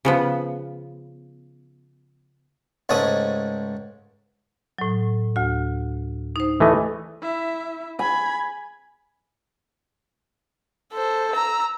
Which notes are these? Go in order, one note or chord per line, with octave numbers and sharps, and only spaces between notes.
C#3 F3 B3
C#2 G#2 G#3 A3 C#4 D#6
A2 F#3
D2 F#4
D#4 C5
E3 A3 D#5
E4 E5
G#5 B5 G#6
A4 C5
A#5 E6